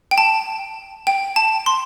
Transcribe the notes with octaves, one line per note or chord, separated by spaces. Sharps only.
G5
A5
G5
A5
C6